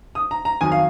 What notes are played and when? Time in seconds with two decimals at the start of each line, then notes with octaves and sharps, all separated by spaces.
0.15 D#6
0.31 A#5
0.45 A#5
0.61 F2 D#3 F#3 G#5
0.72 F5